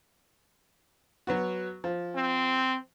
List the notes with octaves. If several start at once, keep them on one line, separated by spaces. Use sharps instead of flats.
F#3 B3 F#4
F3
C4